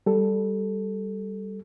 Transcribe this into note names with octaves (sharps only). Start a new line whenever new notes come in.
G3 A4